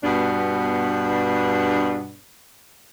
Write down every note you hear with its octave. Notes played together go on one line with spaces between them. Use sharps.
G2 B2 B3 D4